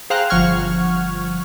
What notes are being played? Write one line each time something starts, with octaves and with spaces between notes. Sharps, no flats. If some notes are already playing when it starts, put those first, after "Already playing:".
G#4 C5 F5 G5 A#5 F#6
G1 F3 F#5 C#6 F6 G#6